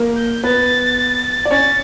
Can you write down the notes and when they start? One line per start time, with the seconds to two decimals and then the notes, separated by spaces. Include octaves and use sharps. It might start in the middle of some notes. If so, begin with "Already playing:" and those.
Already playing: A#3 A#4
0.16 G6
0.44 B3 B4 A6
1.45 D5
1.51 C#4 C#5 A6